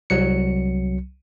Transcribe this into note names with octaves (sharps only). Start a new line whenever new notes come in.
C2 F#3 C#7